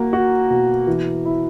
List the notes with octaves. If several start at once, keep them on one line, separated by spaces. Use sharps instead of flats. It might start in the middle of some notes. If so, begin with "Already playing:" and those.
Already playing: A#3 F#4
F#4
B2
E3
E4